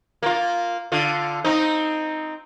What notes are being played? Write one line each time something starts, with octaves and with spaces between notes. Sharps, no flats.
A#3 F4
D3 F4
C4 D#4